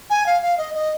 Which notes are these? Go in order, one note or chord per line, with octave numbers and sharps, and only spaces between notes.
G#5
F5
F5
D#5
D#5